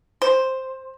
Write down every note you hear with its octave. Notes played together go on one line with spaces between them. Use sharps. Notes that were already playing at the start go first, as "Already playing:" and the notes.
C5